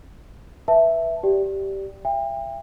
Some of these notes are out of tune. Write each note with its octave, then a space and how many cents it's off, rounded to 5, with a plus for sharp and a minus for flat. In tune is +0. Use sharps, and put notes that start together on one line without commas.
B4 -15 E5 +0 A5 +0
G4 -10 D5 -5 G5 +0
E5 +35 G5 +35